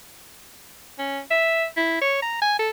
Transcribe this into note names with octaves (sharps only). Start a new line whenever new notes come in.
C#4
E5
E4
C#5
A#5
G#5
A4